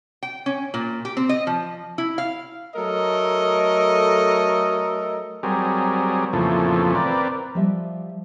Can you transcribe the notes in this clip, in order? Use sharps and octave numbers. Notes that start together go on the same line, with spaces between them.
G5
C#4
A#2
G4
C4
D#5
F3
E4
F5
F#3 A3 A4 A#4 D#5
F#3 G3 C4 G#4 A#4
F2 A#2 C#3 E3 F3 A3
C4 A#4 B4 D5
F3 G3 G4 D#5 E5